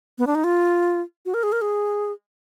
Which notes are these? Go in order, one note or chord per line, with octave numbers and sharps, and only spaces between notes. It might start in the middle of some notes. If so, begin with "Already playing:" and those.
B3
D4
D#4
F4
F#4
A#4
G#4
A#4
G#4